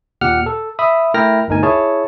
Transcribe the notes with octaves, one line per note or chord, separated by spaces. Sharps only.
D#2 A#2 G4 F#5 F6
A4
E5 B5 D#6
A3 E4 A#4 G5 F6 A#6
G1 D2 D#4 A#4 G#5
E4 G#4 C#5 A5